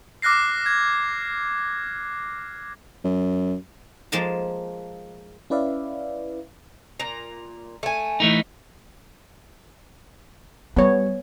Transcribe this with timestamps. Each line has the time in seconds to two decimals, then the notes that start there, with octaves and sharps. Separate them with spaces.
0.22 D6 F6 F#6 A#6 C7
0.66 G#6
3.04 F#2
4.12 F3 G#3 A#3 A#4 A5
5.50 C#4 E4 B4 D5 E5 F5
7.00 A#2 A#5
7.83 A3 G#5
8.20 E3 A3 D#4
10.77 G3 B3 C#5